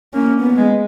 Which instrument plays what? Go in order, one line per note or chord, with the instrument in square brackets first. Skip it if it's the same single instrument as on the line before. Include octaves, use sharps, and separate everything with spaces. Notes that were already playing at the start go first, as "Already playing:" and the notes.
[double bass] A#3 [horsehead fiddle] C#4
[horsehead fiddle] B3
[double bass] G#3